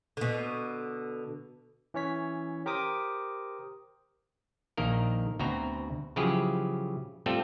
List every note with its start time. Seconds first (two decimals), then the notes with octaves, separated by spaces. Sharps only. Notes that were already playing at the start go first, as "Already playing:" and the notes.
0.17 B2 D3
1.94 E3 C#4 C#5 B6
2.66 G4 A#4 C5 D6 D#6
4.77 A#1 D#3 A#3 A#4
5.39 D2 B2 C4 F#4 A#5
6.16 C#3 F3 F#3 E4 G4 G#4
7.26 G3 A3 C4 F4 A4